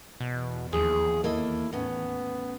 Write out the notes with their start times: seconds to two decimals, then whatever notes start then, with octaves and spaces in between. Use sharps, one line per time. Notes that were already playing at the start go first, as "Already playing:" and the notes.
0.20 E2 B2
0.72 D#2 F3 G#4
1.24 A#3 E4 A4 D#5
1.73 A2 B3 C#4